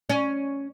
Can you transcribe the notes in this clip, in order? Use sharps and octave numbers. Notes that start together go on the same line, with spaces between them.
C#4